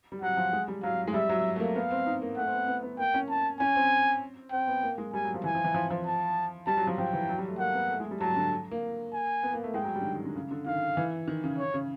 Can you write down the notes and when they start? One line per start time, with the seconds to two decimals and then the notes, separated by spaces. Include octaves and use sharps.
0.12 G3
0.22 F#3 F#5
0.37 F3
0.53 G#3
0.68 G3
0.83 F#3 F5
1.07 G#3
1.14 G3 E5
1.29 F#3
1.56 A3
1.60 A#3
1.75 B3 F5
1.91 C4
2.06 D#4
2.22 A#3
2.37 A3 F#5
2.47 C4
2.52 B3
2.68 B3
2.83 B3
2.98 A#3 G5
3.14 C#4
3.29 A5
3.60 C#4 G#5
3.75 C4
4.52 C4 G5
4.68 B3
4.83 A#3
4.98 G#3
5.13 G3 G#5
5.24 F#3
5.34 F3
5.44 E3 G#5
5.55 F3
5.64 E3
5.74 F3
5.90 F3
6.06 A5
6.67 G3 A5
6.77 F#3
6.87 F3
6.98 F3 G5
7.13 E3
7.29 F#3
7.38 G3
7.48 A3
7.59 A#3 F#5
7.74 B3
7.90 A3
8.00 G#3
8.11 G3
8.21 F#3 A5
8.36 D3
8.71 A#3
9.13 G#5
9.43 B3
9.54 A#3
9.64 A3
9.74 G#3 G5
9.84 F#3
9.95 G3
10.01 D3
10.05 D#3
10.15 D#3
10.25 D3
10.36 C#3
10.51 D3
10.66 D#3 F5
10.97 E3
11.28 D#3
11.44 C#3
11.58 C#5
11.74 C#3